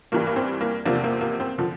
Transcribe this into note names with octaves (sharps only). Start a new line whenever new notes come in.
G2 E3 G3 A#3
A#3
C4
A#3
E2 C3 F3 A#3 D4
A#3
A#3
C4
D3 F3